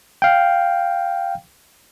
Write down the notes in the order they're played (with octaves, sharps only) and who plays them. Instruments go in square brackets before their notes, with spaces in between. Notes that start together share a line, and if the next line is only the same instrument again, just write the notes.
[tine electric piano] F5 G5